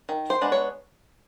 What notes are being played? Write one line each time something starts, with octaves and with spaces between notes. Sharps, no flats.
D#3
C5
G#3 B3 D4
C#5